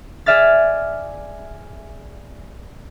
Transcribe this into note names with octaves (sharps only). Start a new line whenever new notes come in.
G#4 D5 E5 F6 A6